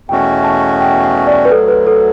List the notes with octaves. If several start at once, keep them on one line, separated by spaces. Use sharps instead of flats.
E2 B2 A3 C#4 F#4 G5
A5
G5
F#5
D5
B4
D2 D3 F#3 A4
B4
A4